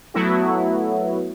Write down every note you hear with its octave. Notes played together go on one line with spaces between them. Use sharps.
F#3 A3 B3 E4 F#4